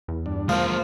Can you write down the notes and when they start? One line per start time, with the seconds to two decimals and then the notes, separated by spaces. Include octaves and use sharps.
0.08 E2
0.26 G2 D4
0.49 F3 G#3 A#3 C5 F5